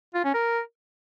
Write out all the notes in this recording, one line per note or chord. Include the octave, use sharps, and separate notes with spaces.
F4
C#4
A#4